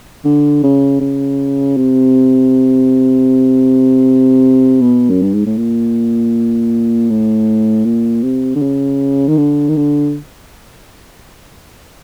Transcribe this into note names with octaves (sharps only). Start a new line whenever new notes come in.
D3
C#3
C#3
C3
B2
F#2
G2
G#2
A2
A#2
A2
A#2
C3
D3
C#3
D#3
D3
D#3
D3